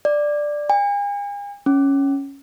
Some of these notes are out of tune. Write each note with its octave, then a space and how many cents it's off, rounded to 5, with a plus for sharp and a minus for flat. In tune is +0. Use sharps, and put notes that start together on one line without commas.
D5 +5
G#5 -40
C#4 +0